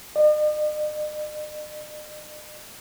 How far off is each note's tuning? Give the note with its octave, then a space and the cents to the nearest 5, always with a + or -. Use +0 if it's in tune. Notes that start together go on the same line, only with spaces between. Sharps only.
D#5 -45